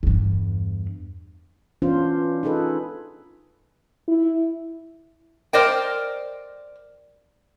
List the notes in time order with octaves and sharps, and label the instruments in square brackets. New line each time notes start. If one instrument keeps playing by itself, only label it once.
[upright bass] E2 G2
[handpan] E3 B3 C#4 D4 F4 C5
D#4 F4 G#4 A4 B4
[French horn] E4
[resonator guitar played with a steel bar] A#4 C5 D5 D#5 G5